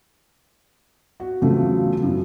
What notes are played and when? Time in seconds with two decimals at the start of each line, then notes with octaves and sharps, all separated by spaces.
1.20 F#4
1.42 E2 C#3 F3 F#3 A3
2.02 F#2 E3